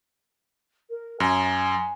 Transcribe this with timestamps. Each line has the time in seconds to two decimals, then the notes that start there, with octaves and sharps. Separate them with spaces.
0.90 A#4
1.20 F#2 G#5